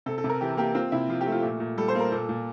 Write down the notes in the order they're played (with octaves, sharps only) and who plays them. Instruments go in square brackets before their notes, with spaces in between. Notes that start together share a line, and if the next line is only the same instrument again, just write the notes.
[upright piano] C3 A4
A4
C3
A#4
E3 G4
A#3 G4
C4 F4
C3 E4
F3 F4
G4
A3
F4
A#2
A#2
G3 A4
C5
A#3
A#4
A#2 A4
A#2